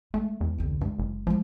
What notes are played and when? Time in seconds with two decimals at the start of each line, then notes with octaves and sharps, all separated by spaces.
0.14 G#3 A3
0.41 E2
0.58 C2 D3
0.81 G2 G#3
0.99 F#1
1.27 F3 G#3 E4